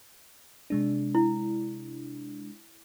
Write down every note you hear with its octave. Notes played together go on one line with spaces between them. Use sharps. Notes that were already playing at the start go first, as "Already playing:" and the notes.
C3 G#3 D4
E4